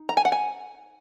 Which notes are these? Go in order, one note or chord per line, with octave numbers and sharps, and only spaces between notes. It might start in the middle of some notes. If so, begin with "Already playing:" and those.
Already playing: D#4
A#5
G#5
F#5
G#5